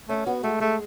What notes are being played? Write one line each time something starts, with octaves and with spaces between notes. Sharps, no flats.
A3 C#4
B3 F#4
G#3 A3
G#3 A3